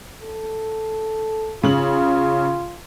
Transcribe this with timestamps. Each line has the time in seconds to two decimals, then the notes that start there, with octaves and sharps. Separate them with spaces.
0.23 A4
1.63 C#3 F4 F#7